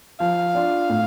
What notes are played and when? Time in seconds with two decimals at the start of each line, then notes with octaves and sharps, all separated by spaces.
0.20 F3 F5
0.55 D4 F4
0.90 A2